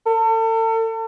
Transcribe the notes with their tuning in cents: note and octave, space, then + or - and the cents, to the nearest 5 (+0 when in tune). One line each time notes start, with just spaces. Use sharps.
A4 +40